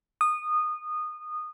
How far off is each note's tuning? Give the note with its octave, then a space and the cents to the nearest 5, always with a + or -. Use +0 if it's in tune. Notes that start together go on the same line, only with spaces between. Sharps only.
D#6 -20